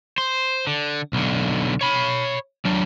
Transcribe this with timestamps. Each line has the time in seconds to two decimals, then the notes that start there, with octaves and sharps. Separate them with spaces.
0.18 C5
0.67 D3
1.13 B1 D3
1.81 C#5 B5
2.65 F#3 D4